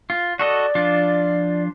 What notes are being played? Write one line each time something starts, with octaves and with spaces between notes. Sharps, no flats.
F4
F#4 A4 D5 D#5
F3 D4 F4